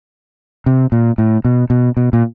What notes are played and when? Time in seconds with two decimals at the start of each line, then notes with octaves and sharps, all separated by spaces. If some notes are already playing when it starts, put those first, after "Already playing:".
0.66 C3
0.92 A#2
1.18 A2
1.45 B2
1.70 B2
1.97 B2
2.13 A#2